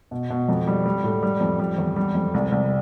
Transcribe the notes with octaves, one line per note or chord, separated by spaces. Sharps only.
B2
B2
F2
G3
G3
A2
G3
F2
G3
E2
G3
F2
C2
C2